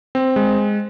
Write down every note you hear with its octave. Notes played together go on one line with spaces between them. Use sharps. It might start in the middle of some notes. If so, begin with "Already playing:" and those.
C4
G#3